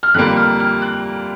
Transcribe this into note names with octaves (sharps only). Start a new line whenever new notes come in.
F6
F2 D3 G3 A#3 F#6
F6
F6
F#6